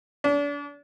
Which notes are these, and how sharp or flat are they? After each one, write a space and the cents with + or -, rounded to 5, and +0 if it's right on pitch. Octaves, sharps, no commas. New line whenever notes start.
D4 -35